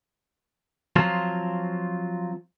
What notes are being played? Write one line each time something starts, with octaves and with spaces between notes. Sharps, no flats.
F3 F#3 C4 F4